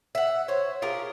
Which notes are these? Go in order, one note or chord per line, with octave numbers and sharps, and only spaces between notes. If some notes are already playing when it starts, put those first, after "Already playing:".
E5 F#5
C5 C#5
F4 G4 G#4 A#4